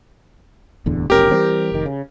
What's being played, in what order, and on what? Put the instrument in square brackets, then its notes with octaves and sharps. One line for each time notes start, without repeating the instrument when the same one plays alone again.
[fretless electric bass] D1 E2 D3
[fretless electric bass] F1 B1 C#4 [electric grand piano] G4 A#4
[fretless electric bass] E3 G3 C4
F1 D#3
C#3